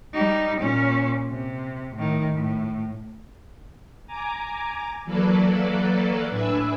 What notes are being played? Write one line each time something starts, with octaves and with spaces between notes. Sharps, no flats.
G3 D#4
A#2 C#4
C3
A2 D#3
A2
G#5 A#5 D6
E3 F#3 A#3 A4 B4 D5
A2 D4 B4 E5 G#5 E6